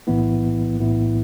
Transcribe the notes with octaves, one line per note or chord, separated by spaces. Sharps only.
B1 A2 E3 B3 E4
B1 A2 E3 B3 E4